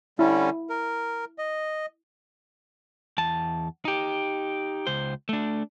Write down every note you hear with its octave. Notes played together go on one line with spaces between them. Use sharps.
D3 G3 C#4 E4
A#4
D#5
E2 A5
D#4 G4
C#2 C5
A3 D4